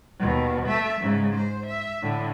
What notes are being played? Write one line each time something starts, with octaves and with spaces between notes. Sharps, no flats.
D#2 B2
A3 E5
G#2 C#3
C5
E5
A2 D3